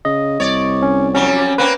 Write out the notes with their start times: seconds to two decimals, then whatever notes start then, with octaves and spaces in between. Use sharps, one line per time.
0.05 C#3 D#5
0.40 C2 C#5 D5
0.82 C#4
1.15 F2 F#3 G3 C#4
1.58 A#3 C4 C#4 B4